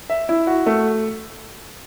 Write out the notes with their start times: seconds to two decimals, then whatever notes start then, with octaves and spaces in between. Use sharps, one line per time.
0.10 E5
0.29 E4
0.47 F#4
0.66 A3